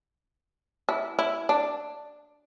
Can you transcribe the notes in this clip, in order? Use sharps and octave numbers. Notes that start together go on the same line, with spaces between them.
E4
E4
D4